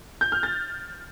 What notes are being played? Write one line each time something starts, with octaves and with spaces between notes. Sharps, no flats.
G6
F6
A6